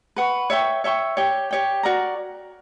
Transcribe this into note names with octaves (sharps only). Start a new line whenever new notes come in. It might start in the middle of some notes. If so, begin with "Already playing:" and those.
B4 F#5 C#6
C#5 E5 G5 C#6
C#5 E5 G5 C#6
G4 C#5 G5
G4 C#5 G5
F#4 A#4 D5 A#5